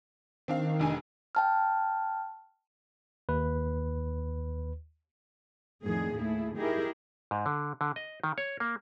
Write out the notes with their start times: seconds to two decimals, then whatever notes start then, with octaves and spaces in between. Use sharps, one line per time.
0.48 D#3 C4 D4 F5
0.79 F1 D4 G#5
1.35 G5 A5 F6
3.29 D#2 B4
5.84 F2 A2 D3 D#3 G#4
6.14 D#2 A3 E4 G#4
6.57 D#4 E4 G4 G#4 A#4
7.31 G#2
7.46 D3
7.81 D3
7.96 D#5
8.24 D#3
8.38 C#5
8.60 A#3